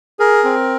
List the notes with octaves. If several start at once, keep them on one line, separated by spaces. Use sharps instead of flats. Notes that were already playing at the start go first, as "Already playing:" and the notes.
G#4 A#4
C4